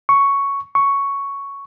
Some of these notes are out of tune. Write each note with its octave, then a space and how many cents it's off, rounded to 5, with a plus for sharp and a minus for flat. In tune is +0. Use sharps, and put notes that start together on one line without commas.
C#6 +5
C#6 +5